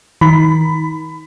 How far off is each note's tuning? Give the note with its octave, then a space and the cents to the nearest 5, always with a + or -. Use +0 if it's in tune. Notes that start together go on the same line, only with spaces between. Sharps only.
D#3 +35 B5 +20